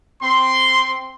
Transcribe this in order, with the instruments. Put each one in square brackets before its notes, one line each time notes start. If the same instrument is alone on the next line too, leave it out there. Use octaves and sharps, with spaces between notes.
[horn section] C4 C6